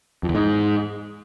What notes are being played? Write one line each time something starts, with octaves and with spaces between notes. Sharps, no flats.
F2
E2
G#2